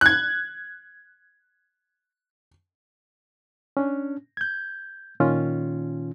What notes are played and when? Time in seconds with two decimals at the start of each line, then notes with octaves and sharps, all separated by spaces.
0.01 F#6 G#6
3.77 C#4 D4
4.37 G6 G#6
5.20 A#2 D#3 C#4 F4